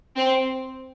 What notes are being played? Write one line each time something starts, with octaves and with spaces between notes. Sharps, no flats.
C4